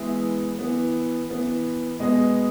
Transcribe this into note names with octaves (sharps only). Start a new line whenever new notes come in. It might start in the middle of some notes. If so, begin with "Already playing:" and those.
Already playing: E3 G#3 B3 E5
E3 B3
E3 B3
B2 G#3 B3 D#5